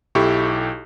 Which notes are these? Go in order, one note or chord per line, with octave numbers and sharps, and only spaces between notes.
B1 E4 G4 A4 C#6